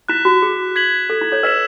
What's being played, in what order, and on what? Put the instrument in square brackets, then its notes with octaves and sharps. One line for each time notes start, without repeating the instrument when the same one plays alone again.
[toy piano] E4 [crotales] F#6 B6 E7
[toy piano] F#4
G#4
[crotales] G#6 B6 F#7
[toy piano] A4
E4
A4 C#5
[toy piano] B4 D#5 [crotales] E6 B6 E7